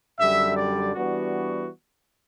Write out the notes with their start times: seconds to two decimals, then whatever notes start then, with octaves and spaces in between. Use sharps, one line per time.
0.19 F#2 D3 G3 E5
0.57 D5
0.94 E3 G3 B3 D4 F#4